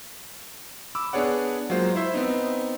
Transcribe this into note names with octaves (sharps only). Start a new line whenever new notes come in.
B5 D6 E6
B3 D4 G#4 C#5 D5 F#5
F#3 G#3 A#3 F4 C5
E4 C5 E5 C6
B3 C4 D#4